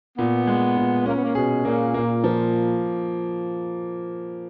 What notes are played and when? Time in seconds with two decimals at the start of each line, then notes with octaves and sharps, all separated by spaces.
0.18 A#2 B3
0.47 G#3
0.77 A#2
1.06 A#3 C#4
1.15 B3
1.23 A#3
1.35 B2 G#4
1.65 A#2 A#3
1.94 A#2 A#3
2.24 F3